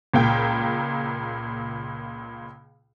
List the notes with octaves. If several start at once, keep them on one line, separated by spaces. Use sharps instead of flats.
C#2 A#2 A#3 G5